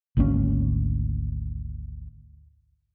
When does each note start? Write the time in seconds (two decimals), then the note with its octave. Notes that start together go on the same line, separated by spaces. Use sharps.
0.17 G#1 D2 A#3 C#4